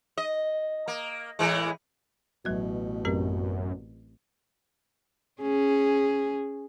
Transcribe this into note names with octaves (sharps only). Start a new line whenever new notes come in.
D#5
A#3
A2 E3 G#3
A1 B2 F#3 G#6
F#2 C4 G4 A#4
C#4 G#4